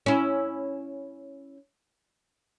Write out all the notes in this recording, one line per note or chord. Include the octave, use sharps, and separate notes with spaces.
C#4 E4